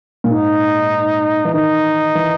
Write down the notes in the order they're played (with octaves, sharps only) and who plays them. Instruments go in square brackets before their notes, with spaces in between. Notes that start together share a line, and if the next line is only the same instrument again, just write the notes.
[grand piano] A#2
[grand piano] G#2 [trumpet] D#4
[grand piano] E3
[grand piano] D#3 [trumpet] D#4
[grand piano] E3